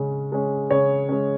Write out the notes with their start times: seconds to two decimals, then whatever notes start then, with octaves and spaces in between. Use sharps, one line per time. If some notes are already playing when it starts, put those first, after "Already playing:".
Already playing: C#3 G#3 C#4
0.32 G#3 C#4
0.70 C#3 C#5
1.09 G#3 C#4